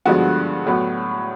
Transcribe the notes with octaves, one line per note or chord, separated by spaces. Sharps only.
G2 D3 F3 G#3 B3 F#4
A2 F#3 B3